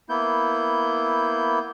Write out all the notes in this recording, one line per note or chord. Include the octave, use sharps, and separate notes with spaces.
A#3 B3 E4 G6